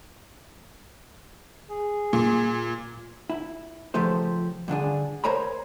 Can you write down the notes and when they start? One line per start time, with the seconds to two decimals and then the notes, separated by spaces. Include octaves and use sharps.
1.69 G#4
2.13 A#2
3.30 E4
3.94 C#3 F3 A3 G4 C5
4.68 G2 D3 D4 G#4
5.24 A#4 C5 C#5 A#5 B5